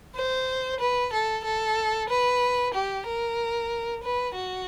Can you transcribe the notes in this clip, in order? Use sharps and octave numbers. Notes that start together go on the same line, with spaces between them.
C5
B4
A4
A4
B4
G4
A#4
B4
F#4